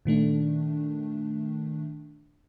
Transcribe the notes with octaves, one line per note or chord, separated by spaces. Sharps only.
A#2 D#3 A3 D4